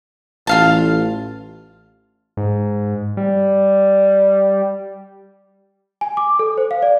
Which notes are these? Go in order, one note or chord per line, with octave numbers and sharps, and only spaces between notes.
A1 F4 F5 A5
G#2
G3
G#5
D6
A4
C5
F5
D5